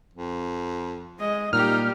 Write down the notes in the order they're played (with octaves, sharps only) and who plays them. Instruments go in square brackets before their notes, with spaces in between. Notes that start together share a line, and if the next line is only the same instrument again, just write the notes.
[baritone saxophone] F2
[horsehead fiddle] G#3 D#5
[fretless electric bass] A#2 [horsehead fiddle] G3 G4 [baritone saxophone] D#4 [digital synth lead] F6